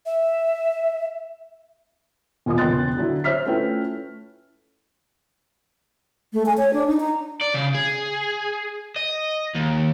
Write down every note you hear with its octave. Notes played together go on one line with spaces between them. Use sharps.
E5
E1 A#2 F4 D#5 D#6
E1 C#2 G5 C6 F#6 A6
D3 F#3 E4
C5 C#5 E5 F6 B6
A3 C#4 E4 F4 B4 G5
A3
G#5
C#5
D4
D#4
A#5
D5
C#3
G#4
D#5
D#2